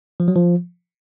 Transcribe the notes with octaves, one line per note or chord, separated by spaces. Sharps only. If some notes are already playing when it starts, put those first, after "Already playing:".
F3
F#3
F3